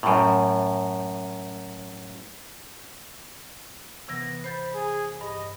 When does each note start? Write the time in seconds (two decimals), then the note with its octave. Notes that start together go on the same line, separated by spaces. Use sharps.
0.03 F#2 A2
4.09 C3 E3 B3 A#6
4.44 C5 B5 G6 A6
4.74 G#4
5.21 G2 D#5